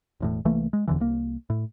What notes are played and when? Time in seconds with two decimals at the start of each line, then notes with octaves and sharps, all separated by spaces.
0.20 E1 E2 A2
0.45 C2 E3 A3 A#3
0.73 G#3
0.88 E1 E2 D3 E3
1.00 C2 A#3
1.50 A2